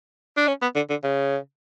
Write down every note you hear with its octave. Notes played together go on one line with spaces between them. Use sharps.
D4
C#4
B3
D3
D3
C#3